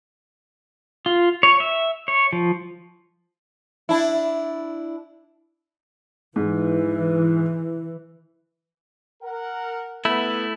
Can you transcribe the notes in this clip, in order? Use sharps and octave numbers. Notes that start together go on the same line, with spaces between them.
F4
C#5
E5
C#5
F3
D4 E4
G#2 E3
A#4 F#5
A3 B3 E4